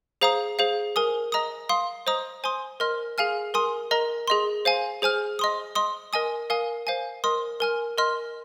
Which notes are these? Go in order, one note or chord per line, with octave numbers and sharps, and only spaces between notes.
G#4 C5 F5 A#5 D#6
G#4 C5 F5
A#4 G#5 D#6
D#5 A#5 D#6
F5 C6 D#6
C5 D#5 A#5 D#6
C5 G#5 C6 D#6
A#4 D#5 C6 F6
G#4 F5 G#5 F6
A#4 G#5 C6 D#6
A#4 D#5 A#5
G#4 D#5 C6
C5 F5 G#5
G#4 C5 G#5 F6
D#5 C6 D#6
D#5 C6 D#6
A#4 D#5 G#5 D#6
A#4 F5 G#5 D#6
C5 F5 G#5
A#4 D#5 C6 D#6
A#4 G#5 F6
A#4 D#5 C6 F6